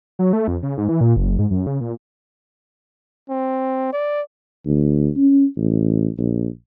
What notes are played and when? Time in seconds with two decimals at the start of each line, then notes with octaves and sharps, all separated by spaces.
0.19 F#3
0.33 A3
0.48 F2
0.63 C#3
0.78 G#2
0.89 E3
1.01 A#2
1.16 F#1
1.39 G#2
1.51 F#2
1.67 C#3
1.81 A#2
3.29 C4
3.93 D5
4.66 D2
5.17 C#4
5.57 A1
6.18 A#1